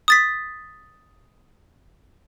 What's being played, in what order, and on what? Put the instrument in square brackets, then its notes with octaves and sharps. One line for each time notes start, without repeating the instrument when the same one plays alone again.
[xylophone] D#6 A6 B6